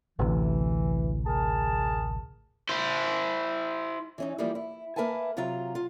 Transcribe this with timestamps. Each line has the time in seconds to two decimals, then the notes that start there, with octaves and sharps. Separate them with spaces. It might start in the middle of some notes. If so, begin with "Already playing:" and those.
0.19 A1 D2 C3 E3
1.26 G#4 A#4 A5
2.69 E4 C5
4.18 E3 C#4 D#4
4.38 E3 F3 G3 A#3
4.55 E4
4.96 A#3 A#4 B4 E5 G#5 A5
5.37 C3 F#3 F4 A#5
5.75 F4